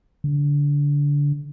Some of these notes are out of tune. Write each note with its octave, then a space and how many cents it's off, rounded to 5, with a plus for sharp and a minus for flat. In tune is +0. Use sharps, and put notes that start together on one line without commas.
D3 -25